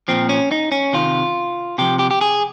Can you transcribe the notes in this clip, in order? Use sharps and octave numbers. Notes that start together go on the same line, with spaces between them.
A#2 F3 C4
C#4
D#4
C#4
C3 D#3 F4
C3 F3 G4
G4
G4
G#4